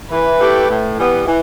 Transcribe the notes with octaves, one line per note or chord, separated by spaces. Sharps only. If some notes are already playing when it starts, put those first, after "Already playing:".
E3 B4
A3 E4 G4
A2
E3 G3 B3
E3